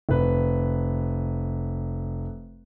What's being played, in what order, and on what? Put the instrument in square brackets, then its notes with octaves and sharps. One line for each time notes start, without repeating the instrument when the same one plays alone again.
[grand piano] F1 B4